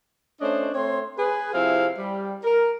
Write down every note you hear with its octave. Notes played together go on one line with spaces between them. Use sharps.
A3 C#4 D4 C5 C#5 D#5
A3 C4 C#5 C6
G#4 B4
C3 F3 C4 E4 G#4 F5
G3
A#4